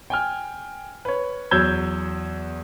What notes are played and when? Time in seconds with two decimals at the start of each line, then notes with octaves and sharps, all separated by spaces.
0.10 G5 G#5 F6
1.05 B4 C#5
1.51 E2 F#3 E6 G6 G#6 G7